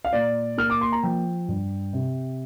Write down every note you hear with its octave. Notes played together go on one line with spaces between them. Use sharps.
F5
A#2 D5
A#3 F6
D6
C6
A#5
F3 G5
G2
C3